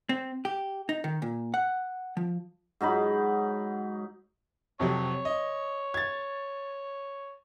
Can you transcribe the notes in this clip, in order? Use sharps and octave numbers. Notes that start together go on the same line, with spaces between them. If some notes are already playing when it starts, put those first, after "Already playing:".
C4
G4
D#4
D#3
A#2
F#5
F3
G#2 F#3 D#4 B5
F2 C3 F#3 C#5
D#5
G#6 A6